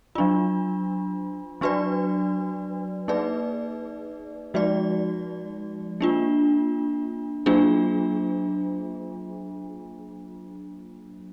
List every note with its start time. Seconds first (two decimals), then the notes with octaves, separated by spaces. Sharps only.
0.15 F#3 D4 F4
1.61 F#3 D4 F#4 B4 D5
3.08 A#3 D#4 G#4 B4 D5
4.54 F3 G#3 D#4 F#4 D5
6.01 A#3 D4 F4
7.46 F#3 A#3 D4 F4 G#4